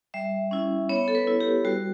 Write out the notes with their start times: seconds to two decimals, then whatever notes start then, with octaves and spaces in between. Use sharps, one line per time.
0.14 G3 E5
0.51 C#4 E4
0.89 B3 C#5
1.08 A4
1.15 B4
1.27 E4
1.41 G4
1.65 G3 F#4